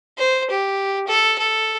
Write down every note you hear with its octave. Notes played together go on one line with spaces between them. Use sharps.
C5
G4
A4
A4